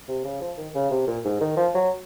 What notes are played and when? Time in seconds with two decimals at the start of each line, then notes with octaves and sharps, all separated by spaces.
0.08 C3
0.24 C#3
0.41 F3
0.57 D#3
0.75 C#3
0.91 C3
1.07 A#2
1.25 G#2
1.41 D#3
1.57 F3
1.74 F#3